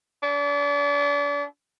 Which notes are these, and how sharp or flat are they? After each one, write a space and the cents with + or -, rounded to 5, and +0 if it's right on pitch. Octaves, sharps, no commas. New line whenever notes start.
D4 -35